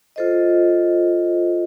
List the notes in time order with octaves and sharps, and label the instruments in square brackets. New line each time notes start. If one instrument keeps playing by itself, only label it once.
[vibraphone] F4 A4 C5 D#5